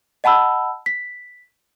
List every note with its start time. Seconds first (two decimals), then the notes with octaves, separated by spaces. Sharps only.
0.24 D#5 F#5 A5 B5 E6
0.86 B6